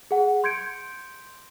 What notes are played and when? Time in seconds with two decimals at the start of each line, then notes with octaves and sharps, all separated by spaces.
0.11 G#4 F#5
0.44 C6 G6 G#6 C#7 D7